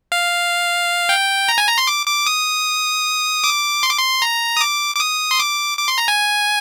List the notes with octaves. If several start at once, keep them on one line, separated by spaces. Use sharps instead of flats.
F5
G5
A#5
G#5
A#5
C6
D6
D6
D#6
D6
C6
D6
C6
A#5
D#6
D6
D6
D#6
C6
D6
D6
C6
A#5
G#5